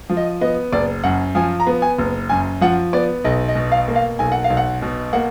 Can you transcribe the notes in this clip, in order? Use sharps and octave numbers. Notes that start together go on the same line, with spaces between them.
F3
D#5
B3 D#5
F#1 D5
F#2 F#5
F3 G#5
A#5
B3
G#5
F#1
F#2 G#5
F3 F#5
B3 D5
B1 D#5
D#5
B2
F5
A#3
F5
B1 G#5
F#5
F5
B1
F#5
B2
A#3 F#5